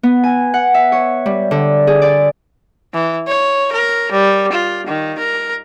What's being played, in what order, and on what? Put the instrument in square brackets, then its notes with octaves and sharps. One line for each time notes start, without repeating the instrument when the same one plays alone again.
[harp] B3
G#5
F#5
E5
C#5
G3
D3
G#4
D5
[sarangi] E3
C#5
A#4
G3
F4
D#3
A#4